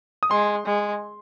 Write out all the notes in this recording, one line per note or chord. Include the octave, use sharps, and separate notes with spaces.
D#6
G#3 C6
G#3